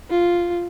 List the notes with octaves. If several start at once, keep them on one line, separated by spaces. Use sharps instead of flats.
F4